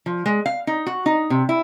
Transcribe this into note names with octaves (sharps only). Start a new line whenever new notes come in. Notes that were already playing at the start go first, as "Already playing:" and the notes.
F3
G#3
F5
D#4
F#4
D#4
C3
E4